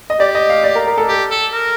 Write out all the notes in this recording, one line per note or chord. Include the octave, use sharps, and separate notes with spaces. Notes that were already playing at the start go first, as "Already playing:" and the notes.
D#5
G4 D5
D#5
F5
D5
A#4
A#4
A4
G4
A4
A#4